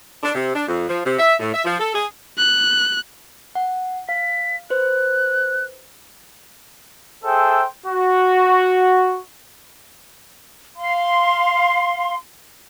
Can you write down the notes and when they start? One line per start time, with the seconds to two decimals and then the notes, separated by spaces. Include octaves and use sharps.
0.23 D4
0.35 C3
0.54 D4
0.67 F2
0.88 F3
1.05 C3
1.19 E5
1.40 A2
1.53 E5
1.65 F3
1.80 A4
1.94 G#4
2.38 F#6
3.55 F#5
4.09 F5 B6
4.70 B4 C5 F#6
7.24 G#4 A4 C5 E5 G5
7.86 F#4
10.76 F5 C6